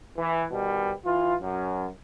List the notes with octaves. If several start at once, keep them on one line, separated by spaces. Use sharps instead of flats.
E3
B2 D#3 G3
E3 F4
F#2